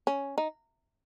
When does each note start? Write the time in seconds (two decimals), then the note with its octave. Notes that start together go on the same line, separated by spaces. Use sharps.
0.07 C#4
0.38 D#4